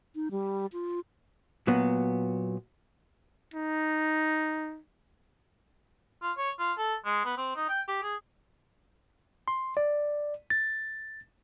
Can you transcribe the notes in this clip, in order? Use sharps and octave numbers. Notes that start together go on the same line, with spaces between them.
D#4
G3
F4
A#2 F#3 B3
D#4
F4
C#5
F4
A4
G#3
B3
C4
D#4
G5
G4
G#4
C6
D5
A6